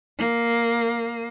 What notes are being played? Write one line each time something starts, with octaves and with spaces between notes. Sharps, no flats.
A#3